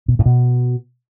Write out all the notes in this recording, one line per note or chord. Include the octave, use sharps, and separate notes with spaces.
B2
A2
B2